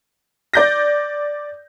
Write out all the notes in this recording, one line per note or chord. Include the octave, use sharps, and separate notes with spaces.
D5 G6 A#6